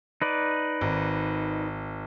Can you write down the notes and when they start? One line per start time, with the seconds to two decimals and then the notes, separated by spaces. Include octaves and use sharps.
0.22 D#4 B4 D5
0.81 G#1